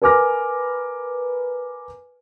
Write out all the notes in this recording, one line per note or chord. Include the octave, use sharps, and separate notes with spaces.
A#4 B4 G#5 D6 F6 A#6